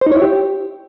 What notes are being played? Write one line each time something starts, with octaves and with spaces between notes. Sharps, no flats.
C5
D#4
C#5
E4
G4